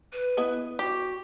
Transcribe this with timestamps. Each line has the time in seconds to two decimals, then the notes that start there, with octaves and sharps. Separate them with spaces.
0.13 B4
0.37 B3 E4 D#5
0.79 F#4 G4